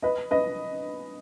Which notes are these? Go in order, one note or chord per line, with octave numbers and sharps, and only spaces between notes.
B4 D#5
B4 D#5